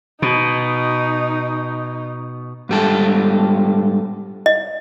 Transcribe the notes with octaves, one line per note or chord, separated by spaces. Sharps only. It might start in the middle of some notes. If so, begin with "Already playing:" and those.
B2 D#4
G#2 G3 A4
D#5